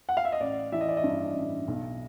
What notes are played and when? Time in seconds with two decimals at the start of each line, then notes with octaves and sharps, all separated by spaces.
0.09 F#5
0.17 F5
0.25 E5
0.32 D#5
0.40 A1 D5
0.72 E3 E5
0.81 D#5
0.89 D5
0.97 D#5
1.04 G2
1.37 A1
1.68 B1